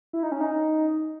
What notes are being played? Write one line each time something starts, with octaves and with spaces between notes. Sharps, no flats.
E4
D#4
C#4
D#4